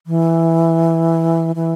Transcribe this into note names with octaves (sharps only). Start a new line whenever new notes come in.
E3
E3